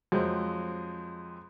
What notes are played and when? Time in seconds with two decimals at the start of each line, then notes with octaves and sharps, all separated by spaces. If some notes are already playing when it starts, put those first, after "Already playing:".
0.12 F2 F#3 G#3 C4